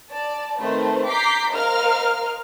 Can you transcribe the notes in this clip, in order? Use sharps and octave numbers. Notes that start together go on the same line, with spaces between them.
D5 A5
D#3 A3 C4 B4 C5
A#5 D6 G6 B6 C7
A#4 C5 D#5 F5 F6